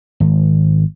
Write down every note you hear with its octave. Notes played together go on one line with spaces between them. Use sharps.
G#1